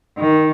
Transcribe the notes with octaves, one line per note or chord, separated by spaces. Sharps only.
D#3